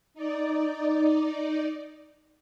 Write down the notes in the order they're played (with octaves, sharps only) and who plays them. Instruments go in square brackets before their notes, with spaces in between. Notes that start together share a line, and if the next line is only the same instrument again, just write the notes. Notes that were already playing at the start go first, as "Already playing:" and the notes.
[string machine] D#4 D5